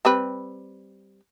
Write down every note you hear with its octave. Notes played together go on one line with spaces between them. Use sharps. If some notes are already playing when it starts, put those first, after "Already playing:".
G3 C4 B4